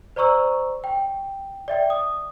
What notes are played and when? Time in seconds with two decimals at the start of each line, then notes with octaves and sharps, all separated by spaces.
0.16 C5 D5 A#5 C#6 E6
0.84 G5
1.68 D5 E5 G5
1.90 D#6